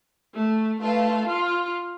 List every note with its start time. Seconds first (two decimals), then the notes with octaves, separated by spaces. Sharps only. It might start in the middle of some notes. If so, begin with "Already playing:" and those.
0.34 A3
0.81 A3 F4 B4 F5 A5
1.27 F4